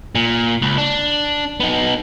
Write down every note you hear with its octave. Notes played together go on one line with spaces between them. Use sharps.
A#2
C#2
D4
B3 D#4